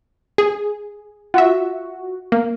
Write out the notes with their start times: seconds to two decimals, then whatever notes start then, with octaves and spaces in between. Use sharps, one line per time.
0.38 G#4
1.34 F4 F#4 E5
2.32 A#3